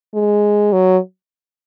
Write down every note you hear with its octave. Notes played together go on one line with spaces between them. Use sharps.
G#3
F#3